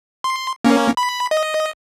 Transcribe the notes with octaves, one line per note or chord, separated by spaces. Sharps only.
C6
A#3 C#4
B5
D#5